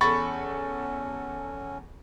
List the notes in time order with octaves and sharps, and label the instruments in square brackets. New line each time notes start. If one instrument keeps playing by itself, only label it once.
[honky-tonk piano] E2 A4 [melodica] C#4 [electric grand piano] B5 C#6 A6